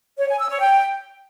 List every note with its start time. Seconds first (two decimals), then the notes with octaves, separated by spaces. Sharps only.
0.18 C#5
0.28 G#5
0.39 E6
0.49 C#5
0.60 G5